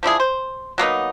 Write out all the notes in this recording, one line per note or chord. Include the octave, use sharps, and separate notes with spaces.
F3 D4 E4 G#4
C5
F#3 A#3 B3 D#4